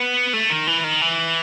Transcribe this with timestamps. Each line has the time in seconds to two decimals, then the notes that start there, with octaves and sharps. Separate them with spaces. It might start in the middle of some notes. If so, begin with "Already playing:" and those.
Already playing: B3
0.33 A3
0.50 D#3
0.67 E3
0.84 D#3
1.02 E3